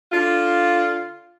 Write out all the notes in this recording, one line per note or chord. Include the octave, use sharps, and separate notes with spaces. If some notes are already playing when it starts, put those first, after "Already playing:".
D3 D4 F4